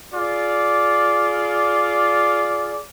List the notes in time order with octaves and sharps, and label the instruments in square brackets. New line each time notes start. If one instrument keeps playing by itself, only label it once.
[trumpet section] F4 G#4 D5